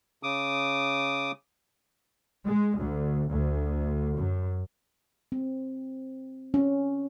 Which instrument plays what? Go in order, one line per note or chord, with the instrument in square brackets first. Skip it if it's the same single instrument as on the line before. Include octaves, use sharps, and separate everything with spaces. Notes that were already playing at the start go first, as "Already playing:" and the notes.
[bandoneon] C#3 D6 D#6
[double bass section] G#3
D2
D2
F#2
[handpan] C4
C#4